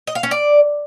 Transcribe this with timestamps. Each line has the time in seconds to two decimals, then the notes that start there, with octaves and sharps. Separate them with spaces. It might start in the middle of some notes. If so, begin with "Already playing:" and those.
0.07 D#5
0.15 F5
0.23 C#4
0.31 D5